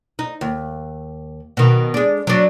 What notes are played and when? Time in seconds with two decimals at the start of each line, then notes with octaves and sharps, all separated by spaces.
0.19 D#4
0.41 D#2
1.57 B2 D#3
1.94 G#3 D4
2.27 F#3 D4